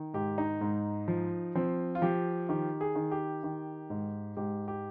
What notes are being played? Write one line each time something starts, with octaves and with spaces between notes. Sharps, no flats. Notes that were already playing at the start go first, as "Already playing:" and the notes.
Already playing: D#3
G#2 G4
D#4
G#2
F3
F3 C4
F4
F3 G4
D#3 G4
G#4
D#3
G4
D#3
G#2
G#2 G4
G4